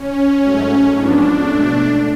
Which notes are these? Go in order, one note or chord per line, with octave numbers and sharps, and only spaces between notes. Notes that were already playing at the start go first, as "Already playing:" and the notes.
Already playing: C#4
G#2 F#3 A3
G#2 F3 B3 D4
B2 A3